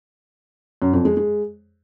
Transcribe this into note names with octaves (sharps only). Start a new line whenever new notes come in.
F#2
F2
G#3
G#3